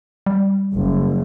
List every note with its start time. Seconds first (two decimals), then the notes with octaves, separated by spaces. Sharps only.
0.26 G3
0.74 F#1